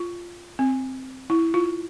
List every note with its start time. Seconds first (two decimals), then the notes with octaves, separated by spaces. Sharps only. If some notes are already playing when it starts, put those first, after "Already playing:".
Already playing: F4
0.59 C4
1.30 E4
1.54 F4